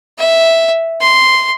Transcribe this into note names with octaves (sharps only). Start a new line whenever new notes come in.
E5
C6